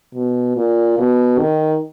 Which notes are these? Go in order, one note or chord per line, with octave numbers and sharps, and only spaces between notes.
B2
A#2
B2
D#3